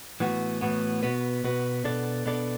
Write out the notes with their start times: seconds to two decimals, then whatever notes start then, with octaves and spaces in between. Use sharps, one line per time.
0.20 A2 E3 B3 F#4
0.61 A2 E3 B3 F#4
1.03 B2 B3 F#4 B4
1.44 B2 B3 F#4 B4
1.84 B2 B3 D4 A4 D5
2.25 B2 B3 D4 A4 D5